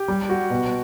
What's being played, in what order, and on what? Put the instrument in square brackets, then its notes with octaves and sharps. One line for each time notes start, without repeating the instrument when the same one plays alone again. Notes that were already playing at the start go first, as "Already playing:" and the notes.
Already playing: [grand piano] G4
G3
F#4
B2